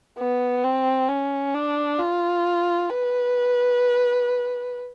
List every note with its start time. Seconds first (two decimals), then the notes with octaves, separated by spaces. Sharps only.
0.19 B3
0.64 C4
1.08 C#4
1.54 D4
1.99 F4
2.89 B4